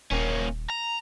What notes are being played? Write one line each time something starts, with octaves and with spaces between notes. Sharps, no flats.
D#1 A#3 C#4
A#5